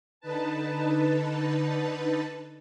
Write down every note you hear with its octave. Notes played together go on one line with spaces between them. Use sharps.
D3 D#4 B4 A5